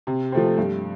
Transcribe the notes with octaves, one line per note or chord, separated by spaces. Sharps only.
C3
F3 A3 C4
G2